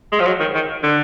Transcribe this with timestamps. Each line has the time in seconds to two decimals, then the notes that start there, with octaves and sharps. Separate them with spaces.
0.12 G#3
0.20 F3
0.26 F#3
0.40 D#3
0.55 D#3
0.83 D3